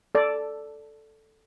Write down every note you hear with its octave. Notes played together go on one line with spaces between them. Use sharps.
A4 D5